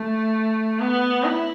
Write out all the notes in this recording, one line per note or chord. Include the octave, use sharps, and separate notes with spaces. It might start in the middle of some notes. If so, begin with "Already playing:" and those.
Already playing: A3
B3
E4